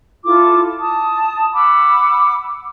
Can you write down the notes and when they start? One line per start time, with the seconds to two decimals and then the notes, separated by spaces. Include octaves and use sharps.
0.25 E4 F4 A4 D6
0.79 A5 D#6
1.53 F#5 B5 D6 E6